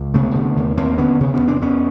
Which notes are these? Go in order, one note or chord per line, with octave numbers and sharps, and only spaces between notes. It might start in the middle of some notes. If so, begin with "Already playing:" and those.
Already playing: C#2
C3 A3 B3
D3
D#2
D#2 A#3 C4
D3 B3 C#4
C3
B3 C#4
E2
C4 D4
E2 B3 C#4